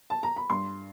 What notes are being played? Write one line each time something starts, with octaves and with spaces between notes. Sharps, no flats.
A5
A#5
B5
G2 C6